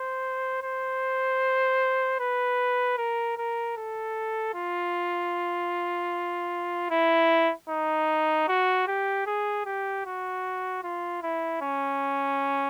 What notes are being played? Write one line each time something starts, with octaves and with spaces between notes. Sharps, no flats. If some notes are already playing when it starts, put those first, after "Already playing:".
Already playing: C5
C5
B4
A#4
A#4
A4
F4
E4
D#4
F#4
G4
G#4
G4
F#4
F4
E4
C#4